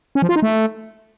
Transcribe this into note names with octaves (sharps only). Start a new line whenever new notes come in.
C#4
F3
F4
D#4
A3